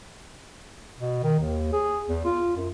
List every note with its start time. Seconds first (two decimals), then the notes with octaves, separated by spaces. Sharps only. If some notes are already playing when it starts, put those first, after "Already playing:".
1.00 B2
1.23 D#3
1.40 D#2
1.73 G#4
2.09 E2
2.25 F4
2.56 F#2